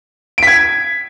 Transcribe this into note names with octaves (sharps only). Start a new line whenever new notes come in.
G#6 B6 D7